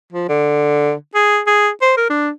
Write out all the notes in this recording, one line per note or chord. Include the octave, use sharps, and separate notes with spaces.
F3
D3
G#4
G#4
C5
A#4
D4